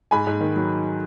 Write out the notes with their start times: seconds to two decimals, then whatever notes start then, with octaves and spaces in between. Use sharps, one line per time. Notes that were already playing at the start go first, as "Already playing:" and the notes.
0.11 G#2 G#5 B5
0.27 G#2
0.40 D#3
0.56 F#3